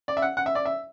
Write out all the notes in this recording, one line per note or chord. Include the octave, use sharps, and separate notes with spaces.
D5
E5
F#5
F#5
E5
D5
E5